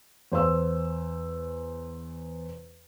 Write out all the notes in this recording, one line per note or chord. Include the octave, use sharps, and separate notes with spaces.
E2 C5 F5 E6